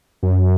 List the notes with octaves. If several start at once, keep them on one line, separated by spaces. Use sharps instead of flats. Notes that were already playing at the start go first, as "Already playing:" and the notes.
F#2